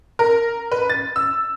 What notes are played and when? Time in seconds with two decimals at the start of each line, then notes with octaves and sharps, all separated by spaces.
0.19 A#4
0.72 B4
0.90 A6
1.16 E6